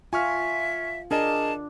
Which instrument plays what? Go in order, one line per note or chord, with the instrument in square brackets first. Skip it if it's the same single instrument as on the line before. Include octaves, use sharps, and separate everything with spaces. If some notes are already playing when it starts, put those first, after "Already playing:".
[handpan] F4 [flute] E5 [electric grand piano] G#5 C#6 F6
[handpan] D4 [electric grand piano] G#4 A#4 D#5 [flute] A5